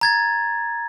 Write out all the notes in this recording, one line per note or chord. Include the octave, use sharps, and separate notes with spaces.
A#5 G#6 A6